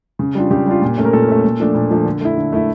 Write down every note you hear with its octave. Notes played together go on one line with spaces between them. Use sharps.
C#3
G3 D4 F4
C#3 G4
G3 D4 F4
A#2
A3 C#4
A#4
A#2 A4
A3 C#4
A#2
F3 A3 D4
A#2
F3 A3 D4
D3
A3 E4
D3
A3 E4